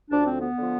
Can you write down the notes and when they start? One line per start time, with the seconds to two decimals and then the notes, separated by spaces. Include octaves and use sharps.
0.11 D2 D3 F3 D4
0.26 C4
0.42 B3
0.58 D3 F3